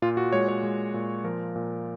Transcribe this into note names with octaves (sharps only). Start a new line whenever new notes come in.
A#2 F4
F#4
G#3 C#5
C#5
G#3
A#2
F3 A#4
A#2